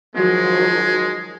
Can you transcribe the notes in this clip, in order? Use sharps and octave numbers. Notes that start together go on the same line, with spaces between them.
D#3 F3 F#3 G#3